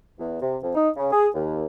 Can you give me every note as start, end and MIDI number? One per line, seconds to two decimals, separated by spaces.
0.19 0.41 40
0.41 0.57 48
0.62 0.72 41
0.75 0.88 63
0.96 1.07 49
1.11 1.27 68
1.34 1.65 39